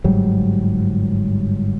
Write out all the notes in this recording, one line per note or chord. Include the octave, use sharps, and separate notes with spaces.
G1 G#2 F#3 G3